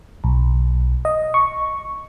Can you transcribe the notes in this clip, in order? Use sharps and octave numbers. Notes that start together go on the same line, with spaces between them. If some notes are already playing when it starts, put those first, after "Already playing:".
B1
D#5
C#6